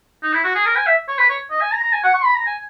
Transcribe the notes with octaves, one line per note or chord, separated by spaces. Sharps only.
D#4
E4
F#4
G#4
A#4
G#5
E5
C#5
B4
C#5
D#5
G#5
A#5
A#5
G#5
F#5
C#6
B5
A#5
G#5